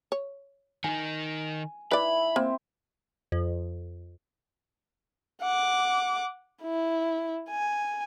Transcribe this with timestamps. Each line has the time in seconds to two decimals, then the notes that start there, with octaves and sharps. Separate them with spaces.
0.12 C#5
0.84 D#3 D#4 G#5
1.91 E4 B4 D5 B5
2.36 A#3 C4
3.32 F2
5.42 F#5 D6
6.63 E4
7.50 G#5